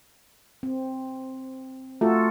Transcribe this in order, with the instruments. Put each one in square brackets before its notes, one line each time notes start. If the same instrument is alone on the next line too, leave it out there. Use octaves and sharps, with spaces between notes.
[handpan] C4
[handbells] A3 [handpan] F4 F#4 A4